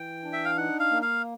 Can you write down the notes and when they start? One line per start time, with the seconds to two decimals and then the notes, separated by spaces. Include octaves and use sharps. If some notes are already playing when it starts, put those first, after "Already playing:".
Already playing: E3 G5
0.24 D4
0.33 E5
0.45 F5
0.57 D#4 F#5
0.80 F5
0.91 A#3
1.02 F5